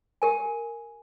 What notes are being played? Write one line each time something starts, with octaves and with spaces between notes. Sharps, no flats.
G4 A#4 G#5